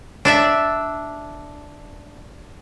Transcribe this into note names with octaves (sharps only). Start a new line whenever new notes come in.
D4 D5 E5